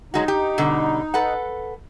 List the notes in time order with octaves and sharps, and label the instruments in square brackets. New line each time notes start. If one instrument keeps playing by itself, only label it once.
[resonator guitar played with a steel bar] F#3 G#3 F#4 [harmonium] D#4
[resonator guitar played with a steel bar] G4
B2 D3 G3
A4 B4 F#5